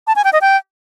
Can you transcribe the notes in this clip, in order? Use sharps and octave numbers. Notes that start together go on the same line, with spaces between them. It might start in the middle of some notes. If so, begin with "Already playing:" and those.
A5
G#5
G5
D#5
G5